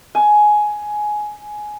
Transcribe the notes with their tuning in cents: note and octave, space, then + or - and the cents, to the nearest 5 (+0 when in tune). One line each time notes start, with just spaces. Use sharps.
G#5 +15